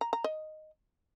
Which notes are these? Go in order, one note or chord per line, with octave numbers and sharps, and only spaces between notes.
A#5
A#5
D#5